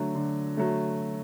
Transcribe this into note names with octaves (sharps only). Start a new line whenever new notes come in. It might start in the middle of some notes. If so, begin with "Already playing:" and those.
Already playing: D3 F#3 A3
D3
F#3 A3